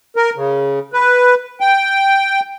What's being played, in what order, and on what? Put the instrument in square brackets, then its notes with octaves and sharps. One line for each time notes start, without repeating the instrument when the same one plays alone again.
[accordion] A#4
C#3
B4
G5